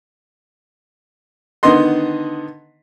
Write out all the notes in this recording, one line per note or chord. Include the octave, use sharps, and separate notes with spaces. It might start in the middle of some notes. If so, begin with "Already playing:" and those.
D3 D#3 B3 D#5 C6